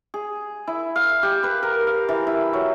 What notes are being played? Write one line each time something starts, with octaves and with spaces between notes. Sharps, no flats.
G#4
E4
F5
G4
B4
A#4
F5
E3
E4
F#3